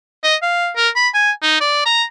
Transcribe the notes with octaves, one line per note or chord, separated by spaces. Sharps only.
D#5
F5
A#4
B5
G#5
D#4
D5
A#5